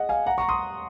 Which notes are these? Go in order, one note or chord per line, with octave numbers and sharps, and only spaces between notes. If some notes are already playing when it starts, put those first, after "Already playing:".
Already playing: G#4 D#5 F#5
F5 G#5
F#5 A#5
A#5 C#6
C6 D#6